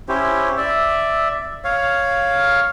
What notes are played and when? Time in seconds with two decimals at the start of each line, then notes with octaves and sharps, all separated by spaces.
0.09 C#4 E4 G4 C5
0.57 D5 E5
1.64 C#5 F5